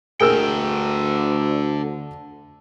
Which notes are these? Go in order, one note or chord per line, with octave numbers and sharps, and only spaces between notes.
D2 D3 G#4 A#4 G5 E6